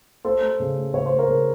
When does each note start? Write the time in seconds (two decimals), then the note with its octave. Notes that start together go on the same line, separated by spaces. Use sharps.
0.25 A3 A4 C5
0.42 A3
0.60 C#3
0.77 A3
0.94 C#3 C#5
1.06 C5
1.11 A3
1.19 A#4 C#5
1.29 C#3